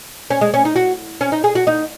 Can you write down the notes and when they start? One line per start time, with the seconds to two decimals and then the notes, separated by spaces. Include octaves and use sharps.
0.30 C#4
0.41 G#3
0.54 C#4
0.65 D#4
0.76 F#4
1.21 C#4
1.32 D#4
1.44 G#4
1.55 F#4
1.67 D#4